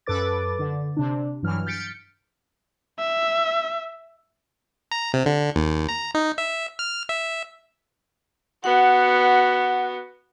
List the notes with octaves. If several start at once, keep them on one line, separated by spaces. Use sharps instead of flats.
F#2 A4 B4 D6 A6
D3
C3 D4
G2 E3 F#3 F6
F6 G6 A6 B6 C#7 D7
E5
A#5
C3
D3
D#2
A#5
D#4
E5
F6
E5
B3 F#4 F#5